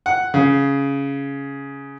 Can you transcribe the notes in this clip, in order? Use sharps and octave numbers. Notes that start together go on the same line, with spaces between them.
F#5
C#3